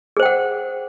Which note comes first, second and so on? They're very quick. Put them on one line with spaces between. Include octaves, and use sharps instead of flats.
G#4 C5 G5 F#5